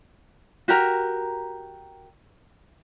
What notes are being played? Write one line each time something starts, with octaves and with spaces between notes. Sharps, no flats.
F#4 G4 A#4 A#5